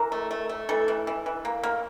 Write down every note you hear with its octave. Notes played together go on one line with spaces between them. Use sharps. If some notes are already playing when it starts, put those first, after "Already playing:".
Already playing: E3 A#4
A3
A3
A3
E3 A4
E3
E3
E3
A#3
A#3